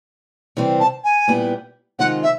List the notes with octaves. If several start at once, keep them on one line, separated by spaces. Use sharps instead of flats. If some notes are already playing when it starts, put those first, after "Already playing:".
C3 E3 G3 C4
A5
G#5
A#2 G3 B3 E4 G4
C3 D#3 G#3 C4 F4 F#5
E5